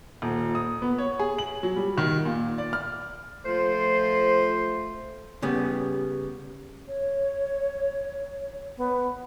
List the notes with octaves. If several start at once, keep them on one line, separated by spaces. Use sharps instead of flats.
D#1
D#6
B3
C#5
G#4
F#7
F#3
G3
D#3
A#2
D5
F6
F3 A3 C5
C#3 G3 B3
C#5
B3